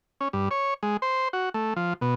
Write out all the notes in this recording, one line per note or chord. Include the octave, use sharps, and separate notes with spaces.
C#4
G2
C#5
G#3
C5
F#4
A3
F3
B2